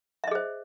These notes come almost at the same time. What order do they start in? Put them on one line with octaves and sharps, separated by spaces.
E5 D#5 G#4 C5